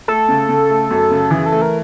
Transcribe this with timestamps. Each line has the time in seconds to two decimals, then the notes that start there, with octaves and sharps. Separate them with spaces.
0.08 A3 A4
0.28 C#3
0.49 C#3
0.70 A3
0.91 F#2
1.11 C#3
1.30 E3 G#4
1.46 A4
1.52 A3
1.62 A#4